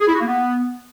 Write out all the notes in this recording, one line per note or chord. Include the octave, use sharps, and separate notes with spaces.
G#4
E4
F#4
A#3
B3